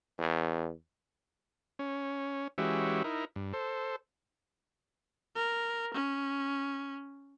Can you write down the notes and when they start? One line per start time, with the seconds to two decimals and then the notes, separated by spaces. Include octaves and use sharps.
0.18 E2
1.79 C#4
2.58 E3 G#3 C#4 F#4 G4 E5
3.04 D#4 E4 A#4
3.36 G2
3.53 A4 C5
5.35 A#4
5.94 C#4